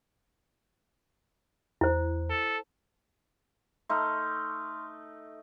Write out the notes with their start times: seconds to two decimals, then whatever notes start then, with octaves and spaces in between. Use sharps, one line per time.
1.81 E2 E4 C5
2.30 A4
3.90 A3 D#4 C6 F6